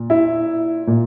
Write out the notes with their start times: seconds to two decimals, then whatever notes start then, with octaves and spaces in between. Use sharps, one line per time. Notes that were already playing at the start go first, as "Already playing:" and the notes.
Already playing: A#2
0.10 E4
0.87 A#2